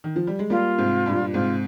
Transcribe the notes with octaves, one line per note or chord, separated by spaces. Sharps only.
D#3
F3
G3
G#3
G3 A#3 F4
G#2 C3
G2 A#2
G#2 C3 F4